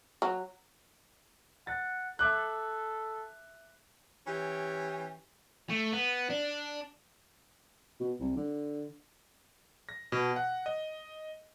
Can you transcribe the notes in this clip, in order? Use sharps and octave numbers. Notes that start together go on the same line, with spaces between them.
F#3
F#5 A6
A4 E5 D6 F#6
E3 C#4 G4
A3
B3
D4
B2
C2
D3
A#6
B2
F#5
D#5